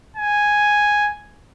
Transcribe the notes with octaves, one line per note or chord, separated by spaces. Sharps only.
G#5